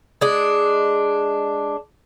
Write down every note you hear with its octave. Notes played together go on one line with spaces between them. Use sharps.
G#3 D4